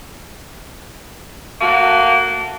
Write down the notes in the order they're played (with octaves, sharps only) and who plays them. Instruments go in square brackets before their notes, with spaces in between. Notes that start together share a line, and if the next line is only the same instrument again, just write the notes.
[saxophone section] A3 A#3 F#4